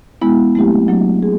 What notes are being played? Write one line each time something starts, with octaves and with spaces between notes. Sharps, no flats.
G#3 B3 E4
F#3 A3 C4 E4 G4
F#3 A#3 D4 F#4
G#4